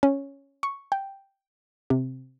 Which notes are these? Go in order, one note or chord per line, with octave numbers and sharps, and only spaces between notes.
C#4
C#6
G5
C3